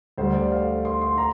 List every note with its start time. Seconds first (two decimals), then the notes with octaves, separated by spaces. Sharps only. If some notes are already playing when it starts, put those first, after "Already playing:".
0.18 D2 D3 G3 C5
0.34 D5
0.51 F5
0.85 C6
1.01 C6
1.18 A#5